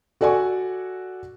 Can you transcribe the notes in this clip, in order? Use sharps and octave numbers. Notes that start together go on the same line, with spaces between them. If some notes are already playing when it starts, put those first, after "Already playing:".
F#4 A4 D5 F#5 G#5 C#6